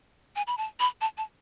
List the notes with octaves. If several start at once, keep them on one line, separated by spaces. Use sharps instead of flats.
G#5
B5
A5
B5
A5
A5